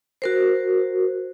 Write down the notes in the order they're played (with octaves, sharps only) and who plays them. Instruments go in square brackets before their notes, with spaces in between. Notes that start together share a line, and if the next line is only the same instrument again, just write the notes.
[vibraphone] F#4 A#4 C5